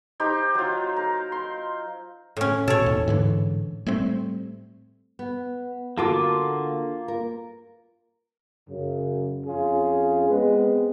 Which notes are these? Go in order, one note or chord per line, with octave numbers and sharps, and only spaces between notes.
D#4 G4 C5
F#3 F4
A#4
C6
A2 C#4
B2 A4 C#5
D#2
G#2 D3 E3
G3 A3 C4
B3
D3 A#3 F4 F#4 A4 D6
A#4
F#2 C#3
F2 C#4 F4 G#4
G#3 B3 C4 B4